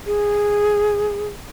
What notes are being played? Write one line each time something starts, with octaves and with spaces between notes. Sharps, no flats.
G#4